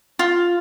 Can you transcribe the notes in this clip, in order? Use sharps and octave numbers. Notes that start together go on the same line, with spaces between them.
F4